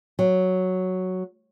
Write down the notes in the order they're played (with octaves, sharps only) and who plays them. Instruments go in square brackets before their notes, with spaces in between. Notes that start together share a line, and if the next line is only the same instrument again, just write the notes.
[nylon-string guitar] F#3